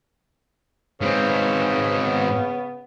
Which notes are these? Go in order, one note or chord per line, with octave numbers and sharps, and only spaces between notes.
G#2 C#3 C4 B4 C5
B3